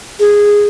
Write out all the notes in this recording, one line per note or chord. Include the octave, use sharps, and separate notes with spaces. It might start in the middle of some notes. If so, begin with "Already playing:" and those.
G#4